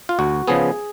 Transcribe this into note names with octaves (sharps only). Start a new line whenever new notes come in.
F4
D2 F#4
C#3 F3 B3 G#4